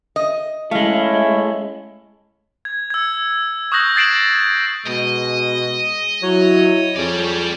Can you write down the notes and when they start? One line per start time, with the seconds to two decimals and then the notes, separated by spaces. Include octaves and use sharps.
0.16 D#5
0.71 G#3 A3 C#4 E4 F5
2.65 G#6
2.90 E6 G#6
3.72 C#6 D#6 F#6 G6 A#6 F#7
3.96 G#6 A6 C7 D7 E7 F#7
4.86 B2 G#3 D#5
6.23 F#3 E4 C#5
6.97 F2 G3 G#4 D5